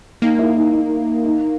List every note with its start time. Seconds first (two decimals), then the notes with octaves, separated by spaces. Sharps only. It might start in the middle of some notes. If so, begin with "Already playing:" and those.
0.22 A#3 D#4
0.39 E4
0.56 D#4
0.73 D#4
1.25 D#4